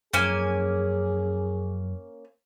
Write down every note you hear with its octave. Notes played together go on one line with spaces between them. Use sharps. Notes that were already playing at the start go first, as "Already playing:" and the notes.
F#2 F3 A#3 C#4 G#4 G#5